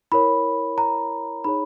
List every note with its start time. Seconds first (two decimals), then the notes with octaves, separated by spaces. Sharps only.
0.12 E4 A#4 C#5 B5
0.78 A#5
1.44 D#4 G#4 C#5 B5